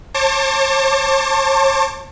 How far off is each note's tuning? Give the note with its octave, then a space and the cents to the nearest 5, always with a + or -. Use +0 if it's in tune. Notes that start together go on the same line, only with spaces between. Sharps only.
C#5 -45 A5 +20 D6 -10